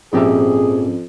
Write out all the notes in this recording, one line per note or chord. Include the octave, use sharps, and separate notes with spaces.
A#1 F2 G#2 C4 C#4 G4 G#4 E5